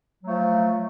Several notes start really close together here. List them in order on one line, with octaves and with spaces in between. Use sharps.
F#3 A3 F3